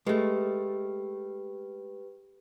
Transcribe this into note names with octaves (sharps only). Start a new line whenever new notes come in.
G#3 A3 G4 B4